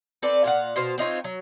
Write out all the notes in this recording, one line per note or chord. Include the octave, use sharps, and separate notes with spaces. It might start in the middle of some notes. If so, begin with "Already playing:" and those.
C4 A4 B4 D5
A#2 F5 F#5
B2 C5 F5
C4 D#4 F4 C#5
F#3